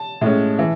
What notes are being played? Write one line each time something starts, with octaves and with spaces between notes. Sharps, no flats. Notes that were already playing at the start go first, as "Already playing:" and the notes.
Already playing: A5
A2 G#3 C#4
E3